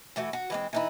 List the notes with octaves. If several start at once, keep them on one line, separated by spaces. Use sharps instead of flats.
E3 A3 F#4
F#4
E3 G#3 C4
E3 D#4 E4